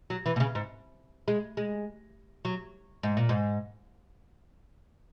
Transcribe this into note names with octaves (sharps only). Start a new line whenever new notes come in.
F#3
E3
B2
C#3
G#2
G#3
G#3
F#3
G#2
A#2
G#2